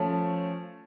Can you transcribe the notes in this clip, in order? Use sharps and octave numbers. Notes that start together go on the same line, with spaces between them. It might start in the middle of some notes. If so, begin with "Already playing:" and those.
Already playing: F3 A3 C#4